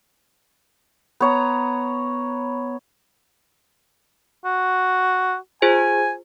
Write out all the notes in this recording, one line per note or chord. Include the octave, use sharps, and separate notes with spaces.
B3 C#5 A#5
F#4
F4 G#4 C5 G#5